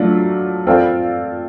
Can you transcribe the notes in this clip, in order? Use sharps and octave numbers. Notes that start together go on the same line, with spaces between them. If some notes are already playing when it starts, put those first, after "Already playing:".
Already playing: F#3 A3 D4 F4
C4 F4 A4 D5 F5